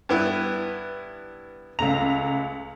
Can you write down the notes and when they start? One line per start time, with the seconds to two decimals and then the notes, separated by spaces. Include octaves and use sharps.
0.09 G2 B3 E4
1.79 C#2 A3 A#5 F7